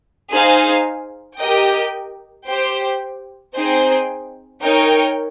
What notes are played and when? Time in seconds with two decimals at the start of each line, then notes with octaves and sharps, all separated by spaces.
0.33 D#4 G#4 C5 F5 G#5
1.40 G4 A#4 D#5 G5
2.48 G4 C5 G5
3.55 C4 D#4 G#4 C5 G5
4.63 D#4 A#4 C#5 G5